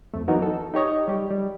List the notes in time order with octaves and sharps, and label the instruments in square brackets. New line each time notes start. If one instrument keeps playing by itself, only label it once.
[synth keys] F2 A3
E3 F#3 B3 D#4 F#4 A#4
A4
D#4 G4 C#5 D#5
G3 G4
G3